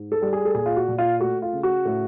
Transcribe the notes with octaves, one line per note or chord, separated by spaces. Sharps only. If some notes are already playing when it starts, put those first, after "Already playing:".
Already playing: G#2
A4
G3
G#4
A4
A#2 G#4
F4
F#4
A#2
F4
A3 F#4
F4
C#3
F#4
A2